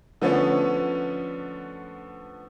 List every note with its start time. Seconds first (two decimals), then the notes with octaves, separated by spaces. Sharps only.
0.22 D3 F3 A3 B3 C#4